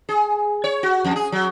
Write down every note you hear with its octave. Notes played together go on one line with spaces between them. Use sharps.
G#4
C#5
F#4
F2
G#4
F#3